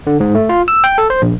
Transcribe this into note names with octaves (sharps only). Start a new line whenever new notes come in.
D3
G#2
A3
F4
E6
G5
A4
C5
A#1